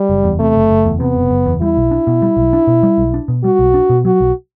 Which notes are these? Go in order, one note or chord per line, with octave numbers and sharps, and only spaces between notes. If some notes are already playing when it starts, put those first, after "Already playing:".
Already playing: G3
F#1
E2
C3 A3
F#1
F#1
E2
C3 B3
F#1
F#1
E2
G3 E4
B1
D4
B2
G3
B1
D4
B2
G3
B1
D4
B2
G3 F#4
B1
D4
B2
F#3 F#4
B1